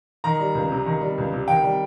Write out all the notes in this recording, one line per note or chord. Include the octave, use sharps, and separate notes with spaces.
D#3 A#5
G3
C#2
C3
D#3
G3
C#2
C3
D#3 G5
G3